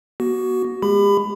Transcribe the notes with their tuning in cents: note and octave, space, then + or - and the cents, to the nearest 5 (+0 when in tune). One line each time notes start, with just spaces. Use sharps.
B3 -40 F#4 +15
G#3 +0 G4 +40 B5 +20